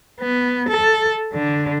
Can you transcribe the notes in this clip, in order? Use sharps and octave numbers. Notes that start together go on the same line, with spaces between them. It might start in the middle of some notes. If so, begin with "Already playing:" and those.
B3
A4
D3